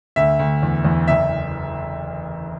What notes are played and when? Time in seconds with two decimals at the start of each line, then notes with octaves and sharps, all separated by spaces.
0.16 D2 E5
0.39 D2
0.63 E2
0.85 E2
1.08 F#1 E5